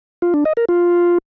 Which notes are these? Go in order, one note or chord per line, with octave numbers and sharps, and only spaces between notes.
F4
D4
D#5
A#4
F4